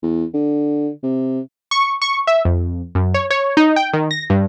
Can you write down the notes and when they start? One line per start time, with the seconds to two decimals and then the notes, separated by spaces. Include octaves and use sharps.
0.03 E2
0.34 D3
1.03 C3
1.71 C#6
2.02 C#6
2.27 E5
2.45 F2
2.95 F#2
3.14 C#5
3.30 C#5
3.57 D#4
3.76 G5
3.93 D#3
4.11 A#6
4.30 G2